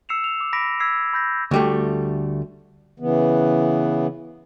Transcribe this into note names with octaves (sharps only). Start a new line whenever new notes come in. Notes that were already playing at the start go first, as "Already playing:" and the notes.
E6 C7 C#7 E7 F7
F7
D6
B5 D6 A#6 B6 D7
E6 G#6 B6 C7
B5 G6 A#6
D2 G3 A3
C#3 E3 B3